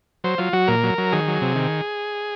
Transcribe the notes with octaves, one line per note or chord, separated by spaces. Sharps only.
F#3 C5
F#3 F4
F#3 F#4
A#2 A#4
F#3
F#3
D#3 G#4
F#3
C3
D#3